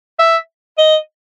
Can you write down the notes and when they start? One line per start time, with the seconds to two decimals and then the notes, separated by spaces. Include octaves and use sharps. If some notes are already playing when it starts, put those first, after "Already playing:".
0.19 E5
0.78 D#5